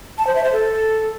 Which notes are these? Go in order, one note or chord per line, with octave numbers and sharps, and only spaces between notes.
A5
C5
E5
C5
A4